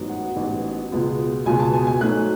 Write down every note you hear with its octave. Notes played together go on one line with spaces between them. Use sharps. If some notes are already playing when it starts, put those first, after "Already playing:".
Already playing: A1 G#2 F#3 B3
F#5
A1 G#2 F#3 B3
C#2 B2 G#3 B3 F4
C#2 B2 G#3 B3 F4 G#5
A5
G#5
G#5
G#2 F#3 A3 F#6